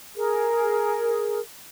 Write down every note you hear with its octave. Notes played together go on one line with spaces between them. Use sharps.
G#4 A#4